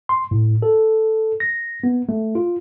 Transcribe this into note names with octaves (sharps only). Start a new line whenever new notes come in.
C6
A2
A4
A#6
B3
A3
F4